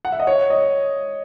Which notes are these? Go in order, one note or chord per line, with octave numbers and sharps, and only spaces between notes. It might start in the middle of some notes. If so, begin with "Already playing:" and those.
F#5
E5
D#5
C#5
D#5